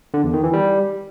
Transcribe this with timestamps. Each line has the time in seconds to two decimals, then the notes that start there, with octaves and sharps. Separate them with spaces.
0.14 D3
0.24 E2
0.34 D#3
0.43 E3
0.53 G3